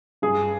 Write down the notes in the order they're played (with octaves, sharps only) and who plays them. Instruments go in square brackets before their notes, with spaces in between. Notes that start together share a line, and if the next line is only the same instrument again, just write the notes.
[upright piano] G2 G#4